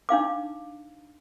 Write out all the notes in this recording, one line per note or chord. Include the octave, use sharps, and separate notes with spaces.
D4 D#4 F5 D6